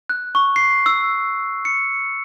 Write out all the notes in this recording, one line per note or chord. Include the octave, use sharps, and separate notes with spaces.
F#6
C#6
C7
E6
C#7